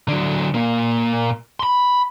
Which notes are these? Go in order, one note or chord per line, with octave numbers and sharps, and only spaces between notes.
D3 F#3
A#2 A#3
B5 C6